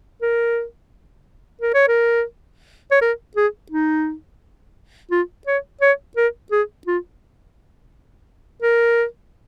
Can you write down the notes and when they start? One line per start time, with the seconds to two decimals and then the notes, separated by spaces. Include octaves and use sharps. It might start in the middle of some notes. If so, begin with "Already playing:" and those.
0.22 A#4
1.61 A#4
1.74 C#5
1.88 A#4
2.91 C#5
3.02 A#4
3.37 G#4
3.72 D#4
5.11 F4
5.47 C#5
5.81 C#5
6.17 A#4
6.52 G#4
6.87 F4
8.62 A#4